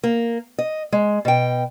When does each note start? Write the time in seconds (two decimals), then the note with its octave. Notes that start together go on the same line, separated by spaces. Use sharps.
0.04 A#3
0.58 D#5
0.92 G#3
1.25 B2 G5